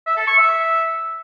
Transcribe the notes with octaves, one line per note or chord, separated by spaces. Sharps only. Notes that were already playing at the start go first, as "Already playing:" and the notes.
E5
A4
C#6
E5